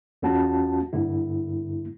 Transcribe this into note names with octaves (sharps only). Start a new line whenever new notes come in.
E2 C#4 F4 F#4 A5
G2 D3 E4